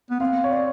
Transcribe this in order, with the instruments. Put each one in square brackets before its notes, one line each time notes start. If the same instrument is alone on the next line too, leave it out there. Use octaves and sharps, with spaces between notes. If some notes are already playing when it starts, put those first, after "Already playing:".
[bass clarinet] B3
[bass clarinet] C4 [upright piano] F5
[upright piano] C#5
D5